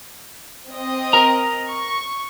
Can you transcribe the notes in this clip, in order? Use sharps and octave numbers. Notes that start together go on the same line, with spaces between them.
C4 D#5
A#4 A#5
C#6